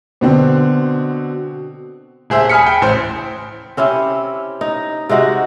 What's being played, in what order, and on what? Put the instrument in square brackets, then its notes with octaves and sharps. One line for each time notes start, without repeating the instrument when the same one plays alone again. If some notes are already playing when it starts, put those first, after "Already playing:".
[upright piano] B2 D3 C4
[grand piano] D#1 G#4 C5 E5
G#5 B5 D#6 F6 B6 C#7
G5
A1 C5
[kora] C4 C#4 E4 G4
D#4
C3 G#3 D#4 F#4